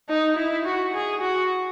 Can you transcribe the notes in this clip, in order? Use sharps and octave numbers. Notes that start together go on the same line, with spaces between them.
D#4
E4
F#4
G#4
F#4